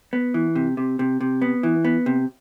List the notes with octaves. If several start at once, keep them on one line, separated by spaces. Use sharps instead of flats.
B3
E3
C3
C3
C3
C3
B3
E3
B3
C3